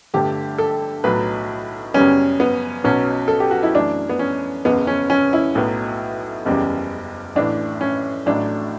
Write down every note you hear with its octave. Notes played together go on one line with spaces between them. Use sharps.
G1 G2 D3 A3 G4
A4
B1 A2 F#3 B4
F#2 C#3 G3 B3 C#4
B3
B1 B2 F#3 B3 C#4
A4
G4
F#4
E4
F#2 E3 A3 D4
B3
C#4
F#1 E2 C#3 B3
C#4
C#4
E4
B1 A2 F#3 B3
F#1 E2 C#3 G3
A1 A2 E3 D4
C#4
A1 A2 F#3 A3 D4